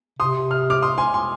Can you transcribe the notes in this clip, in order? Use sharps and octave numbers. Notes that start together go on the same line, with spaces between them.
C3 C6 D#6
F6
D6 F6
C6 D#6
G#5 C6
G#5 C6